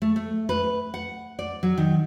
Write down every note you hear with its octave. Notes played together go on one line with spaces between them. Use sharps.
A3
A3
B4
F#5
D5
F#3
D#3